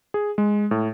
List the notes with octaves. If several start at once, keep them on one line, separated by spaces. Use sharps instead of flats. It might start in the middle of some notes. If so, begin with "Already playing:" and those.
G#4
G#3
A2